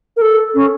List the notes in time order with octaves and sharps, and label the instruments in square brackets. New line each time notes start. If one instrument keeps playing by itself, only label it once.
[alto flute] A#4
A4
C#4